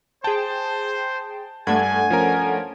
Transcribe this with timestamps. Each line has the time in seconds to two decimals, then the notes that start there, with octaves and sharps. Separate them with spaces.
0.24 G#4 C5 G5 A5
1.67 G2 A3 D4 A4 F#5 G#5 G#6
2.10 F3 C#4 A#4